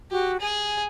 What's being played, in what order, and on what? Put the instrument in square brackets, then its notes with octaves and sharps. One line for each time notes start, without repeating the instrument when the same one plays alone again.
[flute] F#4 [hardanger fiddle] G4
[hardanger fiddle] G#4 [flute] G#5